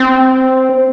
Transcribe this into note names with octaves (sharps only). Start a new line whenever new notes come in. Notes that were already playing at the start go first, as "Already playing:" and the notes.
Already playing: C4